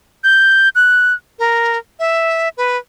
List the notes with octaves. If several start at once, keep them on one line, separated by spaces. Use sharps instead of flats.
G6
F#6
A#4
E5
B4